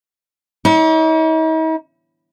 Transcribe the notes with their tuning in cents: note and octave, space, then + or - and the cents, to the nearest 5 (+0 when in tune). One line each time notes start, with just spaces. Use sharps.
D#4 +45 C#5 +45